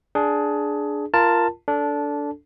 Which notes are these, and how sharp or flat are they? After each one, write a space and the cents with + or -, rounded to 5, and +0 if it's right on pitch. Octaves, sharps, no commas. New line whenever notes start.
D4 +0 G#4 +15
F4 -15 A#4 +0 A5 +10
D4 -15 A4 +0